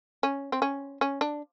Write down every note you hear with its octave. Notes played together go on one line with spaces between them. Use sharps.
C#4
C4
C#4
C#4
D4